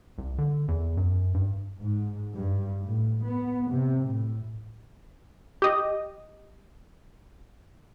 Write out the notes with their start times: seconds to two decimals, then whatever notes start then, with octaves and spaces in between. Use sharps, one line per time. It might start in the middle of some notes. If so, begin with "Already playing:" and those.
0.18 C2
0.38 D3
0.68 E2
0.97 F#2
1.34 G2
1.80 G#2
2.35 G2
2.86 A2
3.24 B3
3.71 C3
4.06 A2
5.62 G4 D#5